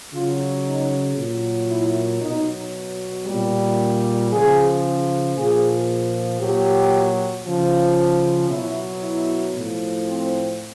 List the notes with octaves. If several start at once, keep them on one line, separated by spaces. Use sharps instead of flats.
C#3 F#3 F4
D#4
A#2 F#3
E4
B2 F#3 D#4
A#2 G3
C#3 F3 G#4
A#2 F3 G#4
A#2 F#3 G4
C#3 F3
B2 F#3 E4
E4
A2 F3
C4